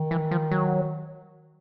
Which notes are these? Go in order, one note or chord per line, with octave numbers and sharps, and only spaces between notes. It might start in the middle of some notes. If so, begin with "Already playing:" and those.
Already playing: D#3
E3
F3
F#3